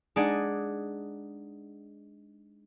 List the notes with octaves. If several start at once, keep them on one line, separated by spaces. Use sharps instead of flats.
G#3 D4 D#4 D5 F#5 G#5